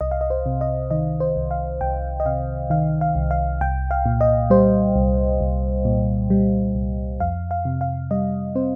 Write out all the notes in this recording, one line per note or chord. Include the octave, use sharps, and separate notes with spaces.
C2 D#5
F5
D#5
C5
C3
D#5
D#3 D#5
C5
C2
F5
C2 G5
D#5
C3 F5
D#3 F5
F5
C2
F5
C2 G5
F5
A#2
D#5
G3 C5
C2
C2
A#2
G3
C2
F2 F5
F5
C3
F5
G3 D#5
C4 C5